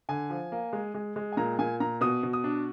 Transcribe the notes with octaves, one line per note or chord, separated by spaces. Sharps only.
D3 G#5
F3
A#3
G#3
G#3
G#3
G#5
A#2 A#5
A#2 G#5
A#2 A#5
B2 D#6
B2
D#6
D4